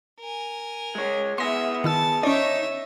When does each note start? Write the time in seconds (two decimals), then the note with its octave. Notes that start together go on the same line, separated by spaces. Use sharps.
0.20 A#4 G#5
0.95 G#3 C#5
1.38 B3 G#4 E5 C6 A#6
1.84 D#3 E4 A5 E6
2.23 C#4 D#4 C#5 D5 E5